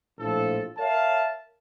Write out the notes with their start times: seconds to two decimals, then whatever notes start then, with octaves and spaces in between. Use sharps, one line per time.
0.18 A#1 A2 F3 A4
0.78 A#4 C#5 E5 F5 A5